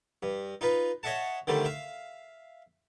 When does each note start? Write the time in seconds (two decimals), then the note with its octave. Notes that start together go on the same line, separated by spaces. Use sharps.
0.23 G2
0.61 D#4 F4 B4
1.03 C#5 D#5 E5 F#5 A5
1.47 D3 D#3 G3 A3 C4
1.65 E5 F5